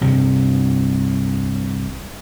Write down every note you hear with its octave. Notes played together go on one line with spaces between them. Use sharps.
C2 G2 C3